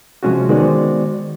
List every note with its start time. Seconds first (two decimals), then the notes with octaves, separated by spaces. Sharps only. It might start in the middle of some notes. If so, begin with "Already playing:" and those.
0.23 C3 F3 G#3 C#4 F4 F#4
0.49 D#3 G#3 B3 F#4 C5 D5